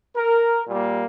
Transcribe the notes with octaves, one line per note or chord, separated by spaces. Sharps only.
A#4
A#2 G3 A#3